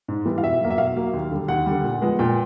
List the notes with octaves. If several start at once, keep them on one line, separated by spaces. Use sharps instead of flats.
G#2
E3 G3
F5
B2 E5
F#3 A#3
E5
B2 F5
F#3 A#3
D#2
D3 G3
D#2 F#5
D3 G3
A#2
F3 G#3 B3
A#2 G5